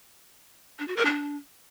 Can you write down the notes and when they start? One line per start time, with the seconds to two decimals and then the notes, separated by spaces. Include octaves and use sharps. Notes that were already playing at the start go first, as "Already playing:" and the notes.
0.79 D4
0.88 F#4
0.97 A#4
1.05 D4